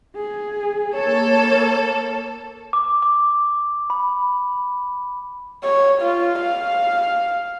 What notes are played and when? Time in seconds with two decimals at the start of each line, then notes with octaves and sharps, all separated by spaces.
0.16 G#4
0.95 A#3 A4 C#5
2.73 D6
3.02 D6
3.90 B5
5.64 C#5
6.02 F4
6.40 F5